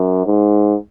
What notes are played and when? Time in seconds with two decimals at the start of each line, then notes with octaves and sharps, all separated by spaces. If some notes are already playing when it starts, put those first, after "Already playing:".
Already playing: F#2
0.26 G#2